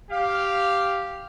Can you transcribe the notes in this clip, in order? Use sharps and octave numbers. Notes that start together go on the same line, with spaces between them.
G4 F5